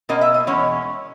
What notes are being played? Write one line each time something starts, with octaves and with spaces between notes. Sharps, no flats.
B2 A#3 C#4 D#5
E5
D#5
E2 B2 G#3 C#4 C#5